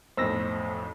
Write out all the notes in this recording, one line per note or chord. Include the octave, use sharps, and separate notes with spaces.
B1 F2 A2 C5 E6 A#6